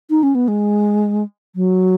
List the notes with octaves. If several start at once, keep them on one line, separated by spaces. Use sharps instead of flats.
D#4
C#4
B3
G#3
F#3